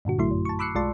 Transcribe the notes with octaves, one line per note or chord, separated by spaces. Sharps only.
G2 A#2 D3 F#4
A1 D3 F#3 A3 E4 C6
F#2
A5 C#6
B5 D6 E6 F#6 C7 C#7
B1 G#3 F4 D5 A5 C6